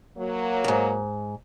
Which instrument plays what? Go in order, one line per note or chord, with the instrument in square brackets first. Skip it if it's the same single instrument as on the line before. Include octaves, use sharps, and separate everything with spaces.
[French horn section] F#3 A#3
[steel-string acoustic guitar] F2 G#2